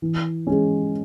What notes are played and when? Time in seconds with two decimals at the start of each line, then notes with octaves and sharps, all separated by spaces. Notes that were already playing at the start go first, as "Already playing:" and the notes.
0.02 E3
0.47 G#3 C#4